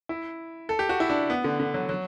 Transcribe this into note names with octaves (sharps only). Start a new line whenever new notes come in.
E4
A4
G4
F#4
E4
D4
B3
D3
D3
F#3
F#3